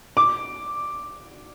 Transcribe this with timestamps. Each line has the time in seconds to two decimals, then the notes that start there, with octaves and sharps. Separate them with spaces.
0.17 D6